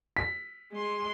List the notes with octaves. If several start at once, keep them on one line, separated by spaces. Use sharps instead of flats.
B6
G#3 C6